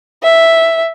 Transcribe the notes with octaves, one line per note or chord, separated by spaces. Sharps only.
E5